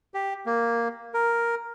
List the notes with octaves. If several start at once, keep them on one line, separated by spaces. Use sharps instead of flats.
G4
A#3
A#4